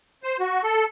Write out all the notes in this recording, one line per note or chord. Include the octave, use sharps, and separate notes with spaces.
C5
F#4
A4